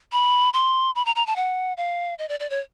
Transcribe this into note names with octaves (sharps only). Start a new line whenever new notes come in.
B5
C6
B5
A#5
A#5
A5
F#5
F5
D#5
D5
D5
C#5